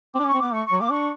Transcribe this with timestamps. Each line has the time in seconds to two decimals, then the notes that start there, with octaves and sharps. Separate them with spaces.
0.14 C4 D6
0.19 D4
0.24 C#4 C#6
0.34 C4
0.39 B3 D6
0.53 A3 C#6
0.66 C#6
0.72 F#3
0.78 A#3 D6
0.91 D4 C#6